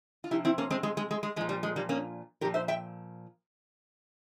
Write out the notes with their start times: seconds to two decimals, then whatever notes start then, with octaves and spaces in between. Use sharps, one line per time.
0.24 F4
0.31 C3 F3 E4 G4
0.45 C4 E4
0.58 A#3 C#4
0.71 G#3 C4
0.83 G#3
0.97 G#3
1.11 G#3
1.23 G#3
1.36 F3 G#3
1.41 A#2
1.49 G3
1.63 G#3
1.76 G3 A#3
1.89 A#3 C#4
2.41 A#2 G4 A#4
2.45 F3
2.54 C5 E5
2.68 E5 G5